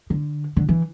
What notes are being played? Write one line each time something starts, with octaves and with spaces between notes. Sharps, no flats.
D3
D3
E3